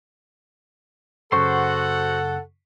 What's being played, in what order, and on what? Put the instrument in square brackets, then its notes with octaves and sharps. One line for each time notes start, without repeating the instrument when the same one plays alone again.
[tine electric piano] F#2 C#3 [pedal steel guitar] F#4 C5 C6 [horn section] A4 F#5 [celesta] C#6